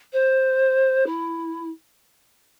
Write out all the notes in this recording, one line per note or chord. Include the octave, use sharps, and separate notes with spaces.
C5
E4